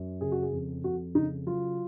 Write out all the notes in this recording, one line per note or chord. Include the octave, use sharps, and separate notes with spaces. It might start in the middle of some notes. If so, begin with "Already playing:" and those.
Already playing: F#2
C#3 G#4
F#4
G#4
F2
F2 F#4
C#3 D#4
F#3 F4